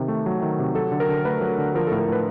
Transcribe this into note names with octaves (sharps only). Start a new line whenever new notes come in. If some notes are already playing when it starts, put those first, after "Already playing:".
Already playing: C3 D#3
A3
F#3
D#3
C3
F#3 A4
D3
A#4
D3
A3 B4
F#3
D3
F3 A#4
A2 A4
A#4
A2 B4